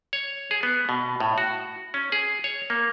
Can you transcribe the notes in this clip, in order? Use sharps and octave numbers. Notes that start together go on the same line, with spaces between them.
C#5
G#4
B3
B2
A2
F#4
C#4
G#4
C#5
A#3